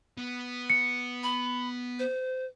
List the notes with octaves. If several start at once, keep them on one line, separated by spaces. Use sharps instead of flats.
B3
C#7
B5
C5